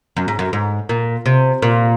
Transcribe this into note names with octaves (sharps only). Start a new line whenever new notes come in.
F#2
G#2
F#2
G#2
A#2
C3
A#2